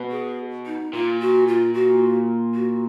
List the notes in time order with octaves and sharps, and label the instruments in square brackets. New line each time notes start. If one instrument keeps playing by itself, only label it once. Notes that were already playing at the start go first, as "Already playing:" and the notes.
Already playing: [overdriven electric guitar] B2
[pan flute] G#4
D#4
[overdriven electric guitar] A#2 [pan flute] F4
[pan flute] F#4
F4
F#4
F#4